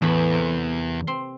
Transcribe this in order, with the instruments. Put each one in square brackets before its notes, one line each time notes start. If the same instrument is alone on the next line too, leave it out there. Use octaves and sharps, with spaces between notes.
[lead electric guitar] E2 [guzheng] A2 E3 B5
[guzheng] C3 A#3
C4 C6